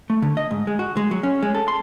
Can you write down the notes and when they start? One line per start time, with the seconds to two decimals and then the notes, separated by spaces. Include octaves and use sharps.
0.10 A3
0.22 D3
0.37 D#5
0.51 G#2
0.67 G#3
0.79 F#4
0.97 G#3
1.11 F#3
1.23 C#4
1.42 G#3
1.54 A4
1.68 C6